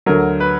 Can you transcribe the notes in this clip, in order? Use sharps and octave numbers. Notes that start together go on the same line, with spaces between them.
D2 D3 F#3 A#4
B4